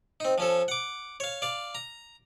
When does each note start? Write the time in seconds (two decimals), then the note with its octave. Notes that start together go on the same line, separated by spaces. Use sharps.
0.20 C4 D#4
0.38 F3 C#4 A4
0.68 F#5 D6
1.20 C#5 F5
1.42 D5 F5
1.75 A#5